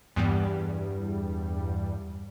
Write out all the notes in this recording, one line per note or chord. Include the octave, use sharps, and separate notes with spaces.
E2 G2 G3